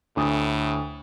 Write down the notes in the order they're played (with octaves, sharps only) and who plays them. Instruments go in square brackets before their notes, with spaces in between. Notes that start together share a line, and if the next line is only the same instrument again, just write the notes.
[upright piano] D2 D#6 [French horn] A2